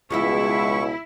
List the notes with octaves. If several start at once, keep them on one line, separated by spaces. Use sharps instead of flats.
C#2 B2 F3 G#3 E4 E5 C#6